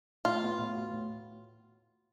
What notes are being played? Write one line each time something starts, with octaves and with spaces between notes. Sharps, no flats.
A2 F4
B3
A2
F#4
A2